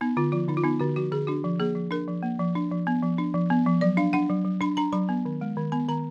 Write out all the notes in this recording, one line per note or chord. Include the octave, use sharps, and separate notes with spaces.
B3 D#4
D3 F4
F3 F4
D3 D#4
F4
B3 D#4
D3 F#4
F3 F#4
D3 G#4
D4 F#4
F3
A#3 G#4
F3
D4 A#4
F3
A#3
F3
D4
F3
B3
F3
D4
F3
B3
F3
F#3 D5
D4 F5
D4 F#5
F#3
F#3
D4 B5
D4 A#5
F#3 B5
B3
D#3
G#3
D#3
B3 B5
D#3 A#5